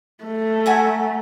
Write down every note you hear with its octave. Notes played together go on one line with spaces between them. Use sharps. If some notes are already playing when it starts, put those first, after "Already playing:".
A3
F#4 G#5 A#5